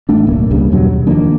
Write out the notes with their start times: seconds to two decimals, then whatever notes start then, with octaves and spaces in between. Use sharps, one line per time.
0.09 A1 A3 D4
0.27 D1 B1 A#3
0.50 C#2 G2 C#3
0.72 E2 G2 B2 F#3
0.93 D#2
1.07 D#3 F3 A#3 D4